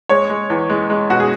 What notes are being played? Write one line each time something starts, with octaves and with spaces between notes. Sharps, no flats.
G#3 C#5
G#3
E2
G#3
G#3
B2 F#4
G#4